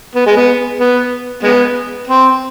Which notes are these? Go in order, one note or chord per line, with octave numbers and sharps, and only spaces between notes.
B3
G#3
B3
B3
G#3 B3
C4